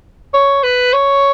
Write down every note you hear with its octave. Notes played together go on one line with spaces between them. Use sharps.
C#5
B4
C#5